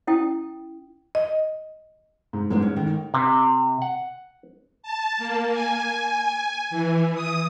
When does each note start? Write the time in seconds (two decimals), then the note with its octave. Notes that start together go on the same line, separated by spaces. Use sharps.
0.07 C#4 E4 G5 D#6
1.15 D#5
2.33 G#2
2.50 A1 G#2 G#3 B3 D4
2.62 C#4
2.76 D#3
3.14 C3
3.82 F#5
4.83 A5
5.18 A#3
5.52 G#5
6.70 E3
7.14 D#6